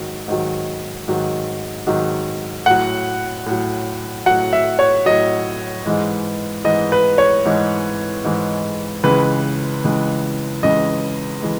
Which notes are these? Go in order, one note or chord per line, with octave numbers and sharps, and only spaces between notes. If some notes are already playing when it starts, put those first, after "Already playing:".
Already playing: G#2 D#3 F#3
G#2 D#3 F#3
G#2 D#3 F#3
G#2 D#3 F#3
A2 F#3 F#5
A2 F#3
A2 F#3 F#5
E5
C#5
A2 F#3 D#5
G#2 E3 G#3
G#2 E3 G#3 D#5
B4
C#5
G#2 E3 G#3
G#2 E3 G#3
C#2 C#3 E3 G#3 B4
C#2 C#3 E3 G#3
C#2 C#3 E3 G#3 D#5
E3 G#3